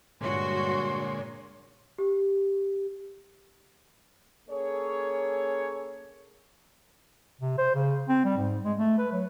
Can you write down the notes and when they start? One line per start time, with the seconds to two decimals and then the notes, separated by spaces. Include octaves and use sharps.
0.21 G2 A#2 D3 G#3 F#4 C#5 C6
1.98 G4
4.49 A#3 C#4 G#4 A4 C#5
7.41 C3
7.58 C5
7.75 C#3
8.09 C4
8.25 G3
8.37 G#2
8.64 G#3
8.78 A3
8.98 B4
9.13 F#3